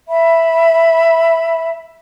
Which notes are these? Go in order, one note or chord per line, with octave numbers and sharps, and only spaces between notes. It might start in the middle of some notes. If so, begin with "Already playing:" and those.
E5 B5